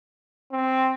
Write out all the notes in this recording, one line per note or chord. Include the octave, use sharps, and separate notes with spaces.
C4